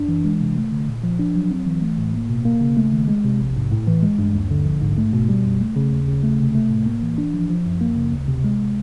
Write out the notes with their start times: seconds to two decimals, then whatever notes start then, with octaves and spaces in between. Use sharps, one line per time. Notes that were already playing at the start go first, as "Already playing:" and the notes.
Already playing: F#2 D4
0.08 E3
0.25 G#3
0.41 C3
0.56 A3
0.72 D3
0.88 A#2
1.03 F3
1.19 D4
1.35 F#3
1.51 C4
1.67 E3
1.82 A3
1.98 A2
2.14 A#3
2.29 B2
2.45 A#3
2.61 C#3
2.77 A3
2.92 D#3
3.08 G#3
3.24 C3
3.40 A#1
3.56 G#2
3.71 A2
3.87 E3
4.03 G#3
4.19 G2
4.35 D#2
4.51 D3
4.66 A#1
4.81 G#2
4.98 A3
5.13 B2
5.29 G3
5.45 F#2
5.61 A3
5.76 C#3
5.92 D#2
6.08 C#3
6.23 A3
6.39 C3
6.55 A3
6.71 A2
6.86 A#3
7.03 E3
7.18 D4
7.34 F3
7.49 F3
7.65 F#2
7.81 A#3
7.96 C#3
8.12 D2
8.28 C3
8.44 G#3